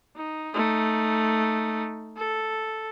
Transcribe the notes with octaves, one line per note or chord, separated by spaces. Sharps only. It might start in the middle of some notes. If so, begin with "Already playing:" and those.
D#4
A3 D#4
A4